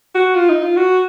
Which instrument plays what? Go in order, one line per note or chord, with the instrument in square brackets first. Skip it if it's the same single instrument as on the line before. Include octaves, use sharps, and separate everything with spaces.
[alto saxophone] F#4
F4
D#4
F4
F#4